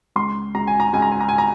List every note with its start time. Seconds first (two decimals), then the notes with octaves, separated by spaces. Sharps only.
0.16 C#2 C6
0.55 C#2 A#5
0.67 G#5
0.80 A#5
0.93 C#2 G#5
1.02 A#5
1.12 G#5
1.20 A#5
1.29 G#5
1.38 A#5